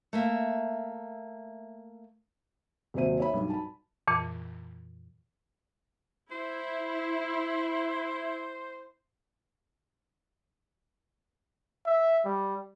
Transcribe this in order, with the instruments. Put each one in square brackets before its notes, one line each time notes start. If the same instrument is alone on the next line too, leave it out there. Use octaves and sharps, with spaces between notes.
[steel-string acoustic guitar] A3 A#3 E5
[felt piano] D#1 C3 F#3 C5 E5 D#7
C#5 E5 B5
B1 G2
A5 B5
[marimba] F2 A#2 E3
[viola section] E4 [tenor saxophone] C5
[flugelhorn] E5
G3